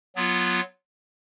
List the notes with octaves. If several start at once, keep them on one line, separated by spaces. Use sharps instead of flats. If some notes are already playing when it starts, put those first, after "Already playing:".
F#3 B3 F4